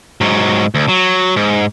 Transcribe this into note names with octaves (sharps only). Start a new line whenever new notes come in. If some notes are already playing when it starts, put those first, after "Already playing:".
G#2 F#3
D2
F#3
G#2